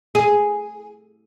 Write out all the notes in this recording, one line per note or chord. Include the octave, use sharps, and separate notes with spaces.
G#4